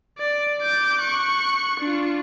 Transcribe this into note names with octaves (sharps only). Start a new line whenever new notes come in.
D5
D6 G6
C#6 F#6
D4 F4